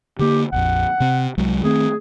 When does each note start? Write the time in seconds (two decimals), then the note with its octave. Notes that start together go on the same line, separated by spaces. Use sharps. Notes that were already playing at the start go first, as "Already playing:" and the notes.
0.19 D3 A#3 G4
0.52 A#1 F2 F#5
1.00 C3 C4
1.38 C2 F#3 G#3
1.63 D#3 A3 C4 G#4